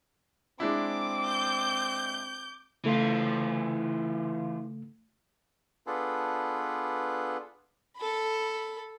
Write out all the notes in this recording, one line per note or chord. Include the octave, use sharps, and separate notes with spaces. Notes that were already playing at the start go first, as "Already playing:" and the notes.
G#3 C4 D4 E4 D6
G6
C#3 E3 A3 F4
B3 D4 F4 G#4 A4 B4
A4 B5